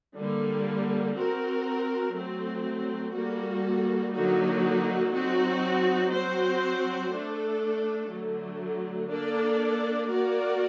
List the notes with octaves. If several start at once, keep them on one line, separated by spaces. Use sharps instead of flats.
D3 G3 A#3
C4 F#4 A#4
F#3 A3 C4
G3 A#3 F#4 A4
D3 F#3 A#3 D#4 F#4
F#3 C4 D#4 F#4
F#3 C4 F#4 C5
A3 D4 A4
D3 F#3 A3
A#3 D4 A4 D5
A#3 F#4 A#4 D5